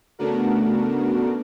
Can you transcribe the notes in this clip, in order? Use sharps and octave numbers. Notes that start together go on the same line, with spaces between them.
C#3 A3 B3 D4 F#4 A#4